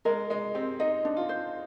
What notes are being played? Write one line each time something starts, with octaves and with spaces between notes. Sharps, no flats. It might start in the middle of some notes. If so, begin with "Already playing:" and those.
G#3 A#4
G#3 D#5
C4 G4
D#4 D#5
D4
F4
C5